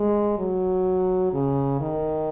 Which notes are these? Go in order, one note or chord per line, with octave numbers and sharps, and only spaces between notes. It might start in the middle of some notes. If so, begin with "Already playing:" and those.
Already playing: G#3
F#3
C#3
D#3